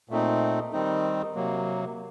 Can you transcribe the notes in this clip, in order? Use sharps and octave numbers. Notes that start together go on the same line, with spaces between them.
A#2 A3 C4 D#4
D#3 G3 C4 D#4
C3 F#3 A#3